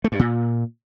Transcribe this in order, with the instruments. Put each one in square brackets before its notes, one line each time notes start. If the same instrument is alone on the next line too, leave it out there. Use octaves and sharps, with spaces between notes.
[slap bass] A3
G2
A#2